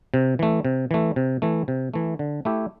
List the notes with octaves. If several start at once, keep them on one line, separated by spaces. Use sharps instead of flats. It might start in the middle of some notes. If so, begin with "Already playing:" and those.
C3
E3 A3
C3
E3 A3
C3
E3 A3
C3
E3 A3
D3
A3 E4 G4